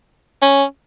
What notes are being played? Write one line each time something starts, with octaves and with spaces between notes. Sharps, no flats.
C#4